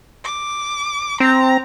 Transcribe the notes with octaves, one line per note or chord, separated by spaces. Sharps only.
D6
C4 A#5